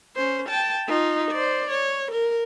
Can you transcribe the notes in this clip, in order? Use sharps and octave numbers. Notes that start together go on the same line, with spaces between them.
C#4 C5
G5 A5
D#4 F4
C5 D5
C#5
A#4